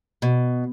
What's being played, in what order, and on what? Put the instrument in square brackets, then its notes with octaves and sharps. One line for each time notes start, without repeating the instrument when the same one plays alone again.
[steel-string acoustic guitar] B2